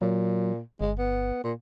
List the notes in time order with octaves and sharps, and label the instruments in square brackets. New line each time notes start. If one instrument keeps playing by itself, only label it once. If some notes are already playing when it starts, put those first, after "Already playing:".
[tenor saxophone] A#2 [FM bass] F#3
[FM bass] G1 [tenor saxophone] G#3
[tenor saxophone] B3
A#2